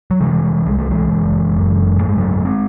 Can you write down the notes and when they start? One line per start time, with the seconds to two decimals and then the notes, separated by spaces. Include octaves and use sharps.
0.11 F#3
0.20 C3 E3 G#3
0.66 C2 G#3
0.78 A3
0.91 E3 G#3
1.10 F#1
1.56 F#2
2.00 G#2 A3
2.09 G#3
2.17 F#3 A3
2.45 G#3 C4